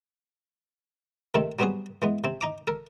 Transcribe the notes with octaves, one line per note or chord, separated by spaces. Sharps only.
C3 D#3 A3 C4 A4
F#3 G3 B3 C4 F#4 G#4
E3 G#3 B3
C3 C4
D#4 A#5 D6
A4 A#4